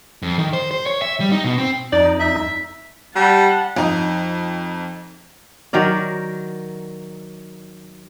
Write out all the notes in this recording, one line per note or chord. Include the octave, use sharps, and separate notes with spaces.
F2
D#3
C5
C5
C#5
E5
G3
D#4
B2
C4
F2 D#4 D5
E5
G3 F#5 A5
F2 D#4
D#3 F#3 A#4 D5